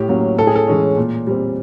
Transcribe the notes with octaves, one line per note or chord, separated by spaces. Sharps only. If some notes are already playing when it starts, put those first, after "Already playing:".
Already playing: A2 G4
F#3 A#3 C#4
A2 A4
G#4
A4
E3 G#3 C#4
A#2
G3 C4